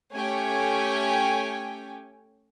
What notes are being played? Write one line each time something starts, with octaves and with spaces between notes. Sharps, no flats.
A3 C#4 G4 C#5 G5 G#5